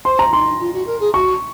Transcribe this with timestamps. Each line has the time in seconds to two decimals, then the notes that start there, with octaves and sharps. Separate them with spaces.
0.05 C5 C6
0.19 A#5
0.32 D#4 C6
0.60 F4
0.73 F#4
0.87 A#4
1.00 G#4
1.14 F#4 C#6